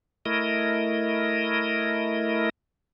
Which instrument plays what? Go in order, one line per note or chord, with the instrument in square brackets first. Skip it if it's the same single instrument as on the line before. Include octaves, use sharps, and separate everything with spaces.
[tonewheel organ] A3 E4 A#4 D#5